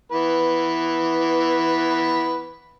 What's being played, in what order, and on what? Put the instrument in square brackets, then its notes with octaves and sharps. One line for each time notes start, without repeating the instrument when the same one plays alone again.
[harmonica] E3 B3 B4